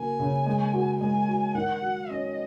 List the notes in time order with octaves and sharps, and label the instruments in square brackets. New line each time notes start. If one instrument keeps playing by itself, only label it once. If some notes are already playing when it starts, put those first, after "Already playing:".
Already playing: [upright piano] C#3 F#3 A#3 [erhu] G#5
[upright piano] C#3
G#3
F#4
[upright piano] G#3 [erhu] G#5
[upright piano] F#4
[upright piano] D#3 [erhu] F#5
[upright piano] F#3
[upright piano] C#4 [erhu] D#5